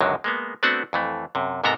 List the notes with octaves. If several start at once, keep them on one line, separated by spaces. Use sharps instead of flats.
C#2 F#2 D3 D#3 F#3 G#3
G#3 A#3 B3
A3 B3 C4 D4 F#4 F#5
F2 E3 A3
F#2 C3
G#2 C3 B3 A4 A#4 A#5